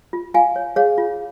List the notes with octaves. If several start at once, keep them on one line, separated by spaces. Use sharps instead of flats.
F4
F4 F5 G#5
C#5
G#4 C#5 F5
F4